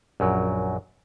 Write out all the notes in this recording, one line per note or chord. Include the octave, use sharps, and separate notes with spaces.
A#1 F#2 F#3